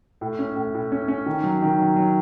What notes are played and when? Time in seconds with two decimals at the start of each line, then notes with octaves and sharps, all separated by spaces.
0.21 A2
0.39 C#4
0.56 A2
0.74 A2
0.92 C#4
1.08 C#4
1.26 D#3
1.44 F#3
1.62 D#3
1.79 F#3
1.96 F#3